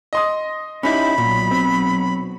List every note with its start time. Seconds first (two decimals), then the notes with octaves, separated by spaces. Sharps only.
0.13 D#5 C6 D#6
0.83 C#4 D#4 E4 G4 B5
1.18 B1 A#2 F#3
1.51 C4